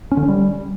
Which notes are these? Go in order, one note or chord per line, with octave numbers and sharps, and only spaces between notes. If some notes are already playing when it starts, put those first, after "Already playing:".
C#4
D3
C#4
G3